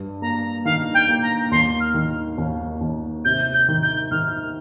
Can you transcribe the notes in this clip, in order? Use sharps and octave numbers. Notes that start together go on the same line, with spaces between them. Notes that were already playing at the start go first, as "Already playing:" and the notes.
Already playing: G2
A#3 A#5
D#3 F5
G5
A#3
A#5
D#2 C6
F6
D#3
D#2
D#2
C3 G6
G6
D#3
G6
D#3 F6